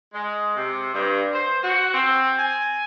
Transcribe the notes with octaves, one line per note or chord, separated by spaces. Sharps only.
G#3
C3
G2
C5
F#4
C4
G#5